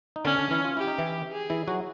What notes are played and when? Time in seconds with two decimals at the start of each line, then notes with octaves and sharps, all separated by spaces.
0.16 D#4
0.24 D3 C#4 D4
0.38 D3 D4
0.51 E3 E4
0.65 F4
0.77 E4 G4
0.87 D#4
0.99 E3 E4
1.32 G#4
1.50 E3 E4
1.68 F#3 F#4